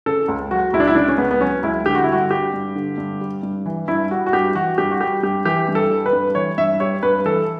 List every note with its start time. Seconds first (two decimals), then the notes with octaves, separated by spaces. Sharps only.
0.06 C#3 A4
0.28 C#2
0.50 F#3 F#4
0.73 C#2 E4
0.80 D4
0.87 E4
0.95 C#3 D4
1.08 C#4
1.18 C#2 B3
1.31 B3
1.41 F#3 C#4
1.63 C#2 E4
1.86 D3 G4
1.95 F#4
2.04 E4
2.08 G2 F#4
2.31 G3 G4
2.53 G2
2.75 D3
2.98 G2
3.21 G3
3.43 G2
3.66 E3
3.88 G2 E4
4.11 G3 F#4
4.26 F#4
4.33 G2 G4
4.55 E3 F#4
4.78 G2 G4
4.91 F#4
5.01 G3 G4
5.23 G2 G4
5.45 E3 G4
5.68 G2
5.75 A4
5.91 G3
6.06 B4
6.13 G2
6.35 E3 C#5
6.58 G2 E5
6.80 G3 C#5
7.03 G2 B4
7.26 E3 A4